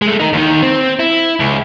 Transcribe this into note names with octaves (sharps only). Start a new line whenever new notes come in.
G#3 A3
D#4 A#4
D#2 D#3
C4
E4
C#2